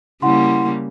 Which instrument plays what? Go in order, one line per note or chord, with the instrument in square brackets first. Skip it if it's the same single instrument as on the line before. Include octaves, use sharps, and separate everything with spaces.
[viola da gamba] C#3 G3 A#3 [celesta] E4 F#5 C6